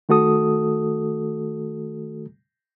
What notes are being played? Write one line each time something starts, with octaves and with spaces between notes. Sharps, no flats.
D#3 A3 F#4 A4 D#6